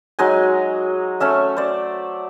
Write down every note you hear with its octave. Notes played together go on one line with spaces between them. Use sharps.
F#3 G#3 D#4 G#5
A3 C#4 E5
C5 D5